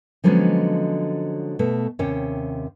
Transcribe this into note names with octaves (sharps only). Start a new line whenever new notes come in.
D3 F3 F#3 G#3 B3 C#4
B2 A3
D#2 C3 C#4 C#5